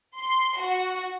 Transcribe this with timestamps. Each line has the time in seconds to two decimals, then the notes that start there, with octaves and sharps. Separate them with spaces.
0.17 C6
0.59 F#4